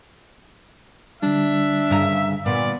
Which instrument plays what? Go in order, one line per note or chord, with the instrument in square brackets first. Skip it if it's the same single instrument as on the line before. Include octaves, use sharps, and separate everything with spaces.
[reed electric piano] D3 G3 [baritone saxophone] D4 [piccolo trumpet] E5
[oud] G2 C#3 A#4
[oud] A#2 [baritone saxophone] B3 [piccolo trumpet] D5